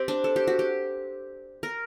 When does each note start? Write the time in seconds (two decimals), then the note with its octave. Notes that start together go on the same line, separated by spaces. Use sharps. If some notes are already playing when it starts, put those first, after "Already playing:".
Already playing: C4 G4
0.08 D4
0.24 A4
0.36 G4
0.47 F#4
0.59 G4
1.63 A#4